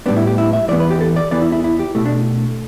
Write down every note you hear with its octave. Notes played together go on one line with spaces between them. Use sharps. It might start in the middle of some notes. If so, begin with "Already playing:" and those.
A2 G3 B3 D4
E4
G4
E4
E5
E2 E3 B3 D5
B4
G4
A4
D5
E2 E3 B3 D5
E4
E4
E4
G4
B2 A3 E4
D4